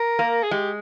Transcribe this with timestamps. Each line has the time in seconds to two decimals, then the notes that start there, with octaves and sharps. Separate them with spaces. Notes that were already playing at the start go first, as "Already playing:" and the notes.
Already playing: A#4
0.19 A#3
0.43 G#4
0.51 G#3 G4